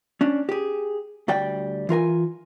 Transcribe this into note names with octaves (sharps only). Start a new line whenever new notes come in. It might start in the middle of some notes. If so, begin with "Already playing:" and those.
C#4 D4
G4 G#4
D2 G3 D5 G5
E3 F4 A#4 G#5